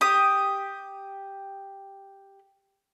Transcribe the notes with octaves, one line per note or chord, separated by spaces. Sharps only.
G4 D#6